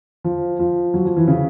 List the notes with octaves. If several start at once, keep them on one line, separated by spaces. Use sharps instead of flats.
F3
F3
F#3
F3
E3
C#3